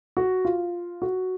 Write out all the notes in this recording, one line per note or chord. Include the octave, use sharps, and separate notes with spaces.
F#4
F4
F#4